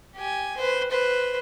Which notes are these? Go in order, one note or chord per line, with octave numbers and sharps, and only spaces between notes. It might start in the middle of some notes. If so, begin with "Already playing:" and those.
G4 G#5
B4 C5
B4 C5